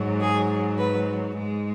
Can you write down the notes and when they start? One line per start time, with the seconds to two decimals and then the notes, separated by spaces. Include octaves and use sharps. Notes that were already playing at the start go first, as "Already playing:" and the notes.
Already playing: G#2 F#3
0.21 G#4
0.79 B4
1.38 G#2 G#3